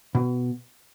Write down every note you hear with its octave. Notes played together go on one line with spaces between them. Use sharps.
B2